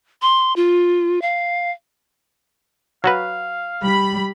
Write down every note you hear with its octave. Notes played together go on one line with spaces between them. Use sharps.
C6
F4
F5
F#3 F#4 B4 F5
G3 B5